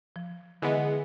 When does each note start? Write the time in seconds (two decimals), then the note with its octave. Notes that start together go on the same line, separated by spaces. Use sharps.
0.16 F3
0.62 D3 E3 G#3 B3